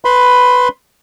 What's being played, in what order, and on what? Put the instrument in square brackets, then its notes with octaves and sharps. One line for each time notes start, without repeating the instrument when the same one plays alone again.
[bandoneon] B4 B5 C6